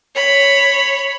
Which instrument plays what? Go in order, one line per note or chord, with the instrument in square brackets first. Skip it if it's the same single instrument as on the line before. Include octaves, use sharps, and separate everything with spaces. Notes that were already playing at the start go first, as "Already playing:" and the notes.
[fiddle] C#5 B5